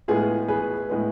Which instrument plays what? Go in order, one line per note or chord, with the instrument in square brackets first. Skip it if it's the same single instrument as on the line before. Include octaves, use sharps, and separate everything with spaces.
[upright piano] A2 G#3 B3 F4 G#4
G#4 B4
A2 G#3 B3